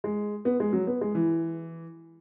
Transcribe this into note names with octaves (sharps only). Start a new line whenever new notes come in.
G#3
B3
G#3
F#3
B3
G#3
E3